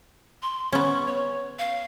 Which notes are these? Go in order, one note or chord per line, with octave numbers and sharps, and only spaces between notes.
C6
B3 C#4 C#6
C#5
F5